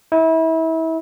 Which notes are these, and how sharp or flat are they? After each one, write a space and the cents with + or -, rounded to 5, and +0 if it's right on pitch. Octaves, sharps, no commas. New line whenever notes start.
E4 -30